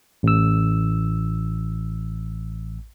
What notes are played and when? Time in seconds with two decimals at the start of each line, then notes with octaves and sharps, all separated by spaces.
0.23 A1 E6